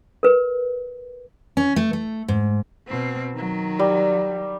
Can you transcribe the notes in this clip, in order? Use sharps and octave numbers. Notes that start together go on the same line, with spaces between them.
A#4 B4
C#4
A3
A3
G#2
B2 C4
D#3 F#3
G3